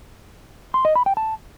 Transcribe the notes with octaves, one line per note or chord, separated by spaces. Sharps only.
C6
D#5
B5
G5
A5